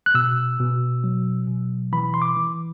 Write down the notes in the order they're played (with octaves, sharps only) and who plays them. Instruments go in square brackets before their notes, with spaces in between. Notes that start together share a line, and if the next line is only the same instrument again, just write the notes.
[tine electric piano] F#6
B2 E6
B2
F#3
B2
E3 B5
C6
D6
E3